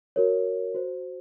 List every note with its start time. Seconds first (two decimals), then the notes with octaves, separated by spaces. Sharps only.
0.16 F#4 A#4 C#5
0.75 F#4 C5